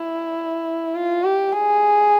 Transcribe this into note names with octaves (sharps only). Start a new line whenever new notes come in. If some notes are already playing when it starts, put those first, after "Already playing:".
Already playing: E4
F4
G4
G#4